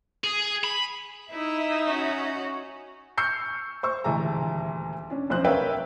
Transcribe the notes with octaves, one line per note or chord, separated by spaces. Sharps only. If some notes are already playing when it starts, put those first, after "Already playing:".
G#4
B5
D#4 E4 E5
C#4 F#4
C#6 E6 F6 G6 C7 C#7
C5 C#6 E6
D#1 D2 E3 G#3 A5 A#5
C#4 D4
B1 F2 C#4 C5 F#6
A#4 B4 C#5 E5 F5 G5